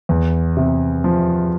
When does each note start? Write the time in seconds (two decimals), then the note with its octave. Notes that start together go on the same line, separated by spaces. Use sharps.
0.09 E2
0.57 C3
1.04 F3